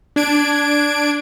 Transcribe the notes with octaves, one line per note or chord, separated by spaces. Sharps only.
D4 G#6 D7